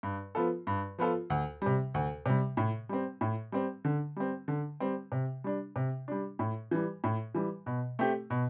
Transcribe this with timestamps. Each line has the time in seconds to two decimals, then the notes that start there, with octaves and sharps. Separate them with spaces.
0.03 G2
0.35 F3 B3 F4 A4
0.67 G2
0.99 F3 B3 F4 A4
1.30 D2
1.62 C3 G3
1.94 D2
2.26 C3 G3
2.57 A2
2.89 G3 C4
3.21 A2
3.52 G3 C4
3.85 D3
4.16 G3 C4
4.48 D3
4.80 G3 C4
5.12 C3
5.44 G3 D4
5.76 C3
6.08 G3 D4
6.39 A2
6.71 E3 G3
7.04 A2
7.35 E3 G3
7.66 B2
7.99 A3 C4 G4
8.30 B2